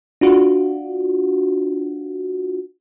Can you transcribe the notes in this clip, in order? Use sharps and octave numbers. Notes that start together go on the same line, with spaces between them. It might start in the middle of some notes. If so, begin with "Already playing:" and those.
D4 F4 F#4